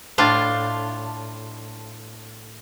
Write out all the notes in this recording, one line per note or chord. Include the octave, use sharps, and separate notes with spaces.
A2 D4 F4